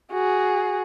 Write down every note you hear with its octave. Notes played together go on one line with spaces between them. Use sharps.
F#4 G#4